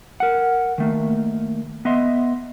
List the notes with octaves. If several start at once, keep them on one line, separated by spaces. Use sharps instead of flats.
A#4 F#5
D#3 A3 A#3
B3 D#5 E5 C6